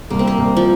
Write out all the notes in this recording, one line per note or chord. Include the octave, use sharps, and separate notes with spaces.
C2 A#3
C4
A#3
C2
F3